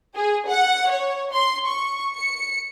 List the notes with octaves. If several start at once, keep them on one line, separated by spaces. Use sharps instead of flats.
G#4
F#5
C#5
C6
C#6
C#7